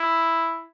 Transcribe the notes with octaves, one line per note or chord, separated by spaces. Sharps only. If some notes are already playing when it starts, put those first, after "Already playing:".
Already playing: E4